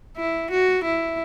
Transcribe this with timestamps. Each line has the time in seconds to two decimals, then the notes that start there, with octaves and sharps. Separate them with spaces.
0.17 E4
0.51 F#4
0.84 E4